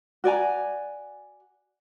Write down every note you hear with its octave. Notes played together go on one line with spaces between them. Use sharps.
F#4 D5 G#5 A#5